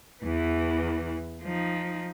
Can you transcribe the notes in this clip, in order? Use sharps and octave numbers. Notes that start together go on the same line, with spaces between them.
E2 E3
F3 D#4